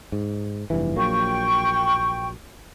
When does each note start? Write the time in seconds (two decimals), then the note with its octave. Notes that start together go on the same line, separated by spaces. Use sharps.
0.12 G#2
0.70 F1 G2 E3
0.96 A#1 F#3 A#3 G5 C#6